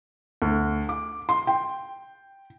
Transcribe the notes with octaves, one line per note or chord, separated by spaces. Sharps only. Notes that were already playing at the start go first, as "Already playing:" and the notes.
D2
D6
C6
G5